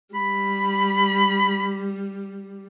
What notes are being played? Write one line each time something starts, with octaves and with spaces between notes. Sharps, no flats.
G3 B5